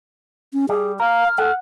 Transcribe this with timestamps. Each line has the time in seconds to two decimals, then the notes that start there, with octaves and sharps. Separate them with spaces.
0.53 C#4
0.69 G3 G#4
1.00 A#4 F5 F6
1.38 A4 F#5